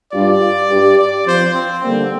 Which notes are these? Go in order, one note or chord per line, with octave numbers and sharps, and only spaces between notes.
G2 G3 D4 F4 D5
G2 G3 D4 G4
D5
F3 C4 F4 C5
C4
D3 G3 A#3 C4